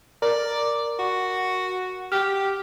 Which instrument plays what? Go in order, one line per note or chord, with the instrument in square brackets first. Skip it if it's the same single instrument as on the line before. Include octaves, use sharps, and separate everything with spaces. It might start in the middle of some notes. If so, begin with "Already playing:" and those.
[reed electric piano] A#4 [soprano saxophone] D5
[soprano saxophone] F#4
[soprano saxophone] G4 [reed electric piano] F6